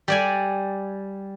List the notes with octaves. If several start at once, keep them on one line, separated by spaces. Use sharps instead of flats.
G3 D5 G#5